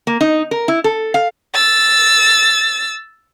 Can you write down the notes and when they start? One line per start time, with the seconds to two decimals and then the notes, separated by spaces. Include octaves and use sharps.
0.07 A#3
0.21 D#4
0.51 A#4
0.68 E4
0.84 A4
1.14 F5
1.54 E6 A6